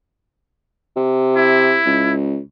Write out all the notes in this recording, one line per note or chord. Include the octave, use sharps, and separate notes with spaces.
C3
E4
C#2